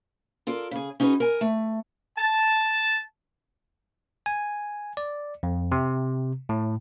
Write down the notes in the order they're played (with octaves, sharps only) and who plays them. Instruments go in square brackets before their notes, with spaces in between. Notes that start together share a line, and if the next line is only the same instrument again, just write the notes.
[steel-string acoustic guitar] F4 A4 A#4 D5
C#3 G#4
C#4 D#4 F#4 G#4 B4
A#4 G#5
A3
[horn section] A5
[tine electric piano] G#5
D5
F2
C3
A2